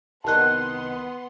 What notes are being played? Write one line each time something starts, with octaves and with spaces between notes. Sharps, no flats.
C2 D#3 B3 D#5 F#5 A5 C6 F#6